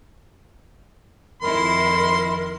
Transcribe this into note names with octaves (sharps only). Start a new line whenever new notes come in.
F2 D#3 E4 A#4 B5 C6